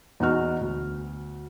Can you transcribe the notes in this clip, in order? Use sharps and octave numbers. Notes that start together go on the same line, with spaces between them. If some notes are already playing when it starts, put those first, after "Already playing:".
E2 D#4 F#4 F6
D2